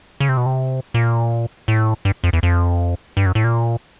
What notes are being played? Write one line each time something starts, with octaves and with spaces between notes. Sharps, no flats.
C#3
C3
B2
C3
A#2
A2
G2
F2
E2
F2
G2
F#2
A2
A#2